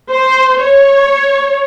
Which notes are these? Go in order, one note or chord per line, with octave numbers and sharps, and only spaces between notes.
C5
C#5